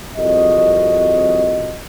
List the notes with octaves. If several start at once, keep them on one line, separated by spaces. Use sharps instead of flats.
C2 F2 F#4 D#5